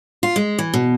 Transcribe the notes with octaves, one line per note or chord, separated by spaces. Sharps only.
F4
G#3
E3
B2